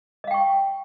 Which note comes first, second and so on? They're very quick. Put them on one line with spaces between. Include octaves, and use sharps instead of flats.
D#5 F5 G5 C#6